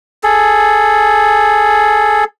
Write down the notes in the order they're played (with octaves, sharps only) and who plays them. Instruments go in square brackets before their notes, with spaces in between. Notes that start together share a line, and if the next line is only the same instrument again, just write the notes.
[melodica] G#4 A4